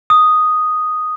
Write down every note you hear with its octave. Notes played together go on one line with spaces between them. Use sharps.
D#6